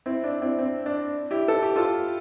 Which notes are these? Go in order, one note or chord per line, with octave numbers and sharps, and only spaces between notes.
C4 E4
D4
C4 E4
C4
D4
E4 G4
A4
G4
F4 A4